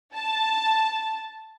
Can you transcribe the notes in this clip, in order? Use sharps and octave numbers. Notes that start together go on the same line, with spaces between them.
A5